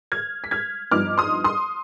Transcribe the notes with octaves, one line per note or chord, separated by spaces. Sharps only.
F6 G#6
B6
F6 G#6
G2 F3 B3 D#4 D6 F6
C6 D#6
C6 D#6